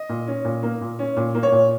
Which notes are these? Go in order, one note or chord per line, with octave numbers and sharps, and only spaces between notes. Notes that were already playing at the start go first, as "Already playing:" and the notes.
Already playing: D#5
A#2
C#4
A#2
A#3
A#2
C#4
A#2
A#3
C#5
A#2